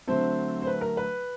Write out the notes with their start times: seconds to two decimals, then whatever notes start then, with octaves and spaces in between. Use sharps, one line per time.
0.07 D3 F#3 A3 C4 C5
0.62 C5
0.67 B4
0.81 A#4
0.97 B4